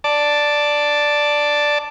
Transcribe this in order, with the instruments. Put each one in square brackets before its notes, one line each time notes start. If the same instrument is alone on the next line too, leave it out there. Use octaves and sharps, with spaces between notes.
[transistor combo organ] D5 A5